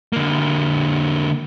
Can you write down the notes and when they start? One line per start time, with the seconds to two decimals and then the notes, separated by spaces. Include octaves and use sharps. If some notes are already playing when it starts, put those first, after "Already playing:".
0.13 D3 A#3